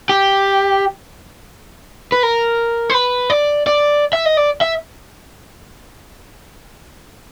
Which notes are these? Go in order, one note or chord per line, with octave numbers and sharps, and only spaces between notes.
G4
B4
A#4
C5
B4
D5
D5
E5
D#5
D5
E5